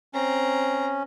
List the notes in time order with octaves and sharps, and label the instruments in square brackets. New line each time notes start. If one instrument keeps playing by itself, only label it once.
[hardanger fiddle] C4 A#5 [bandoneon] C#4